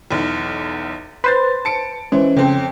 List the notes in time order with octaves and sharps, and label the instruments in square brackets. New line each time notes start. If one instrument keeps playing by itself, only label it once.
[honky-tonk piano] B1 E2
[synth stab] B4 C5 [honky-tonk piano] C6 A6
[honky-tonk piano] A5 C#7 D7
[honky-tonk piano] E3 [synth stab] G#3 [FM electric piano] C#4 C5
[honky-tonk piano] F2 C4 [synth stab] C#3